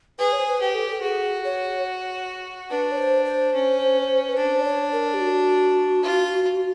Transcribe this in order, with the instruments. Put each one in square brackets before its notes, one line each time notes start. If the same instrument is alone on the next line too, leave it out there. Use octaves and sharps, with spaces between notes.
[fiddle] G#4 [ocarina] B4
[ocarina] C#5
C5
B4
[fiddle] G4
[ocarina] A4
A4
[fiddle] F#4 [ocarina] G#4
[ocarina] C#5
[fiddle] D4 [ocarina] B4
[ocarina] C#5
C5
C5
[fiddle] C#4
[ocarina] B4
[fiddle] D4 [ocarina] C5
[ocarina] D5
C#5
A#4
G4
F#4
[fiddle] F4